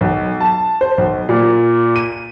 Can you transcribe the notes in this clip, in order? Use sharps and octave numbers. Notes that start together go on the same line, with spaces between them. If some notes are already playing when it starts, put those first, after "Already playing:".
B1
A5
C5
B1
A#2
D#7